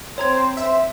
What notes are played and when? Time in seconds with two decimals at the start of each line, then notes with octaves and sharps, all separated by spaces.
0.18 C4 C5 C#5 A#5 G#6
0.57 E5